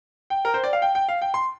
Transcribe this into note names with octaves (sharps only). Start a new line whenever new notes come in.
G5
A#4
C5
D5
F5
G5
G5
F5
G5
C6